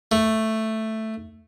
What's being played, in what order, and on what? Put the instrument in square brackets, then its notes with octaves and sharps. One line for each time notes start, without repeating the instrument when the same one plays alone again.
[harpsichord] A3